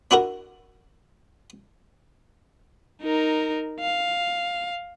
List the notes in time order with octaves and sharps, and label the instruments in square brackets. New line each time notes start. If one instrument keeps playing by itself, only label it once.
[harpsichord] D4 E4 F#4 A#4
[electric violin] D#4 A#4
F5